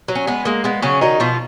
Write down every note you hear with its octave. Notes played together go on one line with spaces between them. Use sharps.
F#3
C#4
G#3 B3
G#3 A#3
G#3 B3
C#3 F#3 C#4
D#3 F#3 D#4
B2 F3 F4